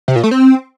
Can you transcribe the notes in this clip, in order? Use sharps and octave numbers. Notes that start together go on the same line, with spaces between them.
C3
A#2
A3
C4